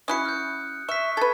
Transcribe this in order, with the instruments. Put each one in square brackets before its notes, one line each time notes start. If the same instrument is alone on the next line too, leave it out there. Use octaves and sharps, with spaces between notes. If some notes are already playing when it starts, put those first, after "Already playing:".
[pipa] C#4 E4 F#4 [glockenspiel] D#6 F#6 C#7
[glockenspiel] F6 G6
[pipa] E5 [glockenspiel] C#6 F6 B6
[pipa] A4 B4 [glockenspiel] G#6